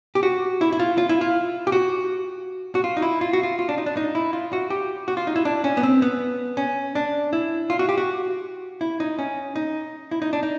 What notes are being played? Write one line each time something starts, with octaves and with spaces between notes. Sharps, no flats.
G4
F#4
E4
E4
F4
F4
E4
F4
G4
F#4
F#4
F4
D#4
E4
F4
F#4
F4
F4
D4
D#4
D4
D#4
E4
F4
F#4
G4
F#4
F4
D#4
E4
D4
C#4
B3
C4
B3
C#4
D4
E4
F4
F#4
G4
F#4
E4
D#4
C#4
D#4
E4
D#4
D4
D#4